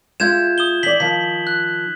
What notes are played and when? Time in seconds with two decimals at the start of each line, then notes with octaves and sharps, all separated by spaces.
0.20 G#3 F4 E5 G6 G#6 E7
0.58 D#6 E7 G7
0.83 E3 D5 B6 F#7
1.00 D#3 F3 B6
1.47 F#6